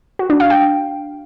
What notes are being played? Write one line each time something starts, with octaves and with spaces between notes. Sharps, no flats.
F#4
D4
F5
G5